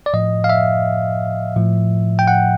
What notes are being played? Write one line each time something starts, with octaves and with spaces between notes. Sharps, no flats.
D5
A2 F3 D#5
F5
E5
A2 F3
G5
F#5